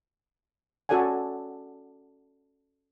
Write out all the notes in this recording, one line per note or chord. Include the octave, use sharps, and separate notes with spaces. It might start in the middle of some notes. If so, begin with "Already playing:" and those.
C#4 F#4 A4 D5 F#5 G#5